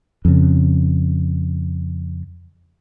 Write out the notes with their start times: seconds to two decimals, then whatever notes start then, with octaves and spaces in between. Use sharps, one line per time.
0.25 F2 C#3